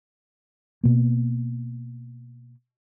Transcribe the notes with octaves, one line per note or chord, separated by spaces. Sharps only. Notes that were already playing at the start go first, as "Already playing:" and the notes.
B2 A#3